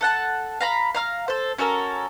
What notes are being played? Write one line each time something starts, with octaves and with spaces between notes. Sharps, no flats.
A4 F#5 A5
F5 A#5 B5
F5 A#5 F6
A4 C5
C#4 F#4 A4 A#4